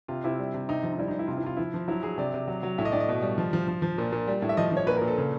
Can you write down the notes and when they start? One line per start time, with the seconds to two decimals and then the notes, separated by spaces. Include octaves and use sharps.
0.08 C3 F4
0.24 C3 E4
0.39 G3
0.54 C3
0.69 C3 D#4
0.83 F3
0.93 D#4
0.98 G3 E4
1.08 D#4
1.14 G3
1.19 E4
1.27 C3 F4
1.37 E4
1.43 C3 F4
1.57 F3 E4
1.74 F3
1.88 F#3 E4
2.03 F#3 G#4
2.18 C3 D5
2.34 C3
2.48 F#3
2.63 F#3
2.78 A2 E5
2.85 D#5
2.92 A2 D5
3.00 D#5
3.09 B2
3.22 G3
3.38 F3
3.53 F3
3.68 F3
3.82 F3
3.98 A#2
4.12 A#2
4.28 G3
4.42 A2
4.49 E5
4.57 F3 D#5
4.72 F3 C#5
4.87 A#2 B4
4.97 A#4
5.02 A#2
5.07 A4
5.18 C#3